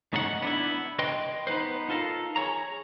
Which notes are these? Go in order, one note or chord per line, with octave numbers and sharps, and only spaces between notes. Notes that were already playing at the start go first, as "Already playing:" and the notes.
G#2 C#3 G#3 D#4 A4 F#5
B3 D4 E4
B4 D#5 G5 C6
B3 D#4 B4 C5
D#4 F4 A4 A#4 F5
G#4 C#5 A#5